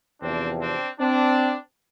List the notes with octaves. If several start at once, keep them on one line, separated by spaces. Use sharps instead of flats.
E2 C3 F3 C4 D4
C4 D4
C4 D4